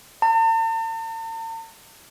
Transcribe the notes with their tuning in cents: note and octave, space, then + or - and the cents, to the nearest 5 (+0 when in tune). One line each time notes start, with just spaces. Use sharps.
A5 +45